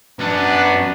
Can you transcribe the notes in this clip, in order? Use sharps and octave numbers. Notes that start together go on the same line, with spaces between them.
F#2 B3 D4 F#5